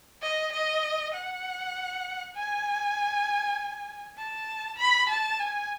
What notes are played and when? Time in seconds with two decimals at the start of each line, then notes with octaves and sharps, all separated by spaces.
0.22 D#5
0.52 D#5
1.14 F#5
2.36 G#5
4.18 A5
4.78 B5
5.09 A5
5.39 G#5